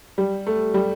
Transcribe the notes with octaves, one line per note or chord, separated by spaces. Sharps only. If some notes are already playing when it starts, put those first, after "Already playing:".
G3
A3
G3